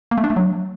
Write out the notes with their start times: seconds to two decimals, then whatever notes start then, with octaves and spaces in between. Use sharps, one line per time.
0.11 A#3
0.18 A3
0.24 D4
0.30 A3
0.36 F#3